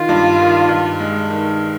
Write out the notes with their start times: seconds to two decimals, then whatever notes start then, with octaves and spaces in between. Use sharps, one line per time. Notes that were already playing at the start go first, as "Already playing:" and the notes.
Already playing: D#3 F4
0.09 G2
0.39 D#3
0.69 G2
0.99 G#3
1.30 D#3